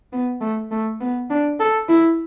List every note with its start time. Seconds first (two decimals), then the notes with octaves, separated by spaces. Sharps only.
0.13 B3
0.41 A3
0.71 A3
1.01 B3
1.30 D4
1.60 A4
1.89 E4